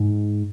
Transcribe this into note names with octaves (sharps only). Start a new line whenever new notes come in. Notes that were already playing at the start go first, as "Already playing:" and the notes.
Already playing: G#2